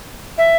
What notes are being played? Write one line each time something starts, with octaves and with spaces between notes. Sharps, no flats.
E5